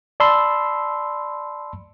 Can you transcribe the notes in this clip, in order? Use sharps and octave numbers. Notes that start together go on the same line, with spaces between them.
D5 A5 B5 C6 E6